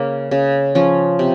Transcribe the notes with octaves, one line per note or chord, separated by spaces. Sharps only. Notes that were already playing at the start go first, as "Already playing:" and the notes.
Already playing: C#3 A#3
C#3
F3 C#4
C3